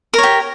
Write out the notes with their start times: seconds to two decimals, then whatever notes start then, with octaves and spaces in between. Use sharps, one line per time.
0.14 A#4
0.18 C#5
0.23 G4